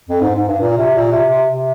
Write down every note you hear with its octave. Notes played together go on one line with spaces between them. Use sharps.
F2
G#2
G#2
G2
A#2
C3
A#2
C3
C3
C3